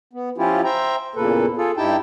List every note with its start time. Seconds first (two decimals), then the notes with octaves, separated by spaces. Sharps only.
0.13 B3
0.38 F3 C#4 E4 F4 G4
0.64 C5 E5 G5 A#5
1.16 E2 A#2 C#3 A#3 A4 B4
1.57 F4 G#4 A4
1.77 G2 D#4 E4 G4 G5 A5